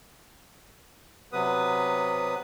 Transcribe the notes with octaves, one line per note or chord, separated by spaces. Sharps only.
C3 F#3 B3 B4 D#6